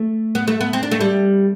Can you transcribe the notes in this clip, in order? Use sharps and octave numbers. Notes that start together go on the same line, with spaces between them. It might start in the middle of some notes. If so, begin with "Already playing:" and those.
Already playing: A3
B3
A3
B3
C4
D4
A3
G3